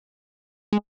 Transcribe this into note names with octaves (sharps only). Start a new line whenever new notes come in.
G#3